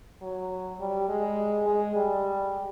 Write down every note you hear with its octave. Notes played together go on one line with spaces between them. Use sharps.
F#3
G3
G#3
G#3
G3